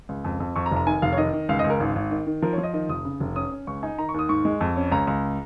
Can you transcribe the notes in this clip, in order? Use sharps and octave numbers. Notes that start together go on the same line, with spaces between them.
C#2
F2
F2
F2 C#6
A#5
F1
A#5
D#3 G#5
F1 F5
C#5
D#3 D#5
D#3
C#2 F5
D#5
C#2
A#4
G#1
G#1
D#3
D#3
F3 A#4
C#5
F3
D#5
D#3 D#5
F1 D#6
C#3
F1
C#4 D#6
C#4
C#2 C#6
D#4 G#5
D#3 A#5
C#6
D#2 D#6
G#2 C#6
G#3
F2
C#4
C#2 A#5
C#2 A#5